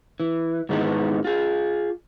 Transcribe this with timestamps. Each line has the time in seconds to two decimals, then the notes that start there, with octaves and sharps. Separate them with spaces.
0.20 E3
0.69 G#2 D#3 E3 G#3 B3
1.25 F4 G#4